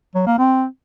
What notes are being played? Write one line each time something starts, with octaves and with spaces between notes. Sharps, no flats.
F#3
A#3
C4